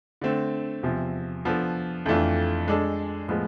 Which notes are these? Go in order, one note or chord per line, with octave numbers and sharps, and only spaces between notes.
D3 A3 C4
E2 C3 F3
F3 B3 D4 A4
F2 E3 A3 D4 F4
G#3 D4 A4
A2 F3 G#3 B3